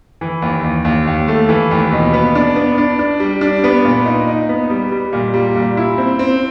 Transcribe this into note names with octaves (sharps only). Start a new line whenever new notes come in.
E3
D#2
D#2
D#2
D#2
A3
E3
D#2
B2
B3
D4
B3
D4
D4
G3
D4
B3
A#2
D#4
D#4
B3
G3
G3
A#2
G3
A#2
E4
C4
C4